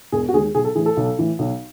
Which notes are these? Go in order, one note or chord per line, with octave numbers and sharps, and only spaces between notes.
E1 G#4
F#4
D#2 D#3 G#3 G#4
B1 G#4
A4
A2 E3 G#4
A4
B1
A2 E3
B1